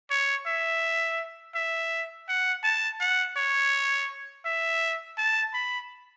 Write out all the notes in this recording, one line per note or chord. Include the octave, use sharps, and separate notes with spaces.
C#5
E5
E5
F#5
A5
F#5
C#5
E5
A5
B5